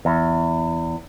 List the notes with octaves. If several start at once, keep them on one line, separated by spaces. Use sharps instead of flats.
E2